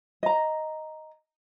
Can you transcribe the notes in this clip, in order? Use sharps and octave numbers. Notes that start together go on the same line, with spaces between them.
D#5 A#5